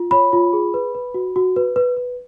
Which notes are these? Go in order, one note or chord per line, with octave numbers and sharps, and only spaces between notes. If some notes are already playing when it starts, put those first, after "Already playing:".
Already playing: F4
C#5 B5
F4
G#4
B4
B4
F#4
F#4
B4
B4
B4